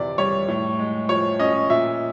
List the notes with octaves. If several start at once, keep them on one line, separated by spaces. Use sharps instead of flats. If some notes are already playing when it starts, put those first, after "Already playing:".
Already playing: F2 C3 E3 D5
G3 C#5
A2
G#3
F3 C#5
C#4 D#5
A#2 E5